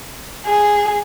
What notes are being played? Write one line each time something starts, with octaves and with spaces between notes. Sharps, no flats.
G#4